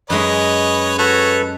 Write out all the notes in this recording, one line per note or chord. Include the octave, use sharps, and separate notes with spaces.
F#2 G#3 B4 C#5 D#5
F#4 A4 B4 C#5